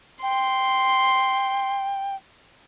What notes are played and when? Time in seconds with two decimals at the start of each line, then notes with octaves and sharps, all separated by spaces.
0.23 G5 C6